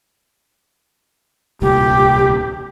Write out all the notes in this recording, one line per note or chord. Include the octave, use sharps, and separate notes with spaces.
D1 C2 A#2 G4